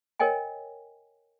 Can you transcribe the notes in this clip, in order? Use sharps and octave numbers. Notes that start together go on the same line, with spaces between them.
A#4 C#5 D#5 G5 G#5